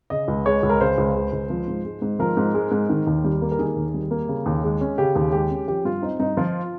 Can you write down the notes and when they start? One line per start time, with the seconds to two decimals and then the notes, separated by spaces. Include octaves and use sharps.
0.10 C#3 D#5
0.28 C#2
0.46 G#3 C#5
0.63 C#2
0.70 A#4
0.81 C#3 C5
0.98 C#2
1.15 G#3
1.33 C#2
1.50 F3
1.68 G#2
1.85 G#3
2.02 G#2
2.19 F3 A#4
2.37 G#2
2.54 G#3
2.71 G#2
2.89 D#3
3.07 D#2
3.24 G3
3.42 A#3
3.52 A#4
3.59 D#3 G#4
3.76 D#2
3.94 G3
4.11 A#3
4.29 C#3
4.46 D#2
4.64 G#3
4.81 C#4
4.98 C#3 G4
5.15 D#2
5.32 G#3 G4
5.51 C#4
5.68 F3 G4
5.85 G2 F4
6.02 C4 D#4
6.20 G2 D#4
6.37 F3 F4